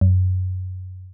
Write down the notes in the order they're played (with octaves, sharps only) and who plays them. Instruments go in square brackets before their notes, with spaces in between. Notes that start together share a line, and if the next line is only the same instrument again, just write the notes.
[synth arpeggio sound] F#2